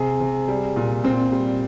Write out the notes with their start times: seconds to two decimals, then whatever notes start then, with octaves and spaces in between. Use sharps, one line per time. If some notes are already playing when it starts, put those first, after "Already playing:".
Already playing: C3 G#4
0.21 C3
0.48 G3
0.76 A#2
1.04 A#2 C4
1.32 G3